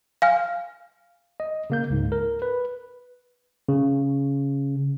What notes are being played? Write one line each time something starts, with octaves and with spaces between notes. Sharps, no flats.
F5 G#5 F6
D#5
C#3 A#3 G6
C#2 G#2
A#4
B4
C#3